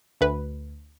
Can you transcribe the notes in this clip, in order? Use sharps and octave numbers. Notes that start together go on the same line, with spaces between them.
D2 B4